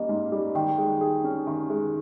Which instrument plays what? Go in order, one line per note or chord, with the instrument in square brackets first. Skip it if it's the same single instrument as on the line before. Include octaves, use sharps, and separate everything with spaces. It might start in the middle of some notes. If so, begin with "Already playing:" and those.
Already playing: [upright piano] G3 A#3 C#4 [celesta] D#5
[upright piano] G#2
G3
[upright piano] D#3 [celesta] G5
[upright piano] G#3
G#4
C#4
D#3
G#3